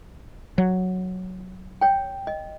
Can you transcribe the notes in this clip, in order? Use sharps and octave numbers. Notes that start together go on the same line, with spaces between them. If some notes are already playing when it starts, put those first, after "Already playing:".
F#3
C#5 G5
D#5